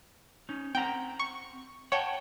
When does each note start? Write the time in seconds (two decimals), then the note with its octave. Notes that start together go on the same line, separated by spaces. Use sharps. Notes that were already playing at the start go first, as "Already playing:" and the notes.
0.49 C#4 D#4
0.75 C4 F#5 G5 A#5
1.19 C#6
1.92 C#5 F#5 G5 A5